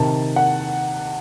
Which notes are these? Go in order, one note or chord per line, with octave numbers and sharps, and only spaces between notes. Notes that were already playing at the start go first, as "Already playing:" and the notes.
Already playing: C3 D#3 A5
F#5